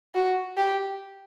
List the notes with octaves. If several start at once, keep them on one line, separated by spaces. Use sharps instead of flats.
F#4
G4